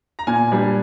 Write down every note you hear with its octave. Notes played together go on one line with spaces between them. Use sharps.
A#5
A#2 G#5
G3 D4